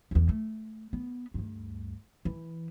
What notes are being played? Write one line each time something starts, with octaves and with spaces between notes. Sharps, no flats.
G1 E2
A3
B3
D2 G2
E3